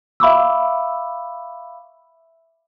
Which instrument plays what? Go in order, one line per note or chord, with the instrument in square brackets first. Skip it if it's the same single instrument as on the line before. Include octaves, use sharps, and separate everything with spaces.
[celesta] E5 F5 B5 C#6 D6 E6